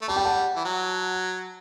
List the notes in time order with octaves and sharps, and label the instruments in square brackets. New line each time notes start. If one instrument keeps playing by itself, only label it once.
[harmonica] A3
[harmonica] G3 [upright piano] A5
[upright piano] G5
F#5 A5
[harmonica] E3
F#3